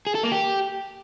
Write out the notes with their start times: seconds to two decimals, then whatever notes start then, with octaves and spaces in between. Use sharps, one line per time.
0.07 G#4
0.15 A4
0.23 A#3
0.32 G4